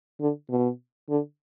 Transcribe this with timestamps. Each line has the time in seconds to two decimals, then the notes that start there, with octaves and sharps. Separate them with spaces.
0.21 D3
0.50 B2
1.09 D3